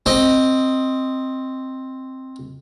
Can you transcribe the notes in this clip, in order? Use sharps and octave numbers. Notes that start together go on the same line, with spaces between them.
C4 D#5